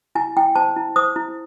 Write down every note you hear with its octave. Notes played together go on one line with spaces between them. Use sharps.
E4 G#5
E4 G5
C5 A5
E4
C5 D#6
E4